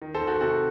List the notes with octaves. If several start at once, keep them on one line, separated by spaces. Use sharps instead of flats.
D#3
A4 C5
D#3
F#4 A4
C3 F#4 A4